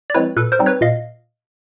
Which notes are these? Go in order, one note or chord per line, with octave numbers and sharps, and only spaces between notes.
D5
F3 G#3 C4 E4 B4 C#5
A#2 A4 B4
A#4 C5
G3 C4 D#4
B4 C#5
A#2 D#5 F5